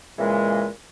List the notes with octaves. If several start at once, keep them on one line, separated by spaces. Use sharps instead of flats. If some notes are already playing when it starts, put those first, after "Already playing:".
A#2 C#3 E3 G#3